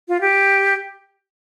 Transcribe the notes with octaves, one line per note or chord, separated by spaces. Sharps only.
F4
G4